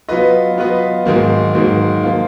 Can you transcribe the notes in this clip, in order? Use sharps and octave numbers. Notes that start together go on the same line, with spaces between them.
F#3 B3 F4 B4 D#5
F#3 B3 F4 B4 D#5
G#2 D#3 F#3 A#3
G#2 D#3 F#3 A#3
F3 A#3 F4